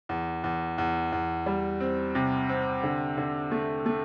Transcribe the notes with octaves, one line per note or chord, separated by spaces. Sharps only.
E2
E2
E2
E2
G3
C4
C3
C4
D3
D3
A3
A3